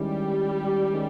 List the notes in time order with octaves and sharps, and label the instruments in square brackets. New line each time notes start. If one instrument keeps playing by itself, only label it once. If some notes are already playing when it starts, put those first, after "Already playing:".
Already playing: [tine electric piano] D#3 G#3 C#4 E4 [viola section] G3 G4
[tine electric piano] D#3 G#3 C#4